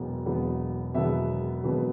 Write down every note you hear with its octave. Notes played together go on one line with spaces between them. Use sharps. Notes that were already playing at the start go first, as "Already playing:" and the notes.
Already playing: E1 E2 B2 F#3 B3
E1 E2 B2 F#3 B3
E1 E2 B2 F#3 B3 E5
E1 E2 B2 F#3 B3